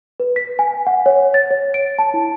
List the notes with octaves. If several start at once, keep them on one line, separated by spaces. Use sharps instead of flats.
B4
B6
G#5
F#5
C#5
A6
C#5
D7
A5
E4